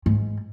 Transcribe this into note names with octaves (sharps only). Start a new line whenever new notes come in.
G#2